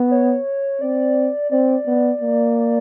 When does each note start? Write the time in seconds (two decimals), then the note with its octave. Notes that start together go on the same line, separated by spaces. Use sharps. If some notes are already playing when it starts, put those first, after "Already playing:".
Already playing: B3
0.11 C#5
0.81 C4 D5
1.51 C4 D5
1.87 B3
2.21 A#3